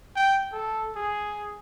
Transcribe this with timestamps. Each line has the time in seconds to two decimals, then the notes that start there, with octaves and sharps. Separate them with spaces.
0.16 G5
0.52 A4
0.96 G#4